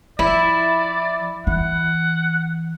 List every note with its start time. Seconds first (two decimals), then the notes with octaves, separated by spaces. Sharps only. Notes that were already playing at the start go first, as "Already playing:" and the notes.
0.19 F3 E4 D5
1.47 E3 F#5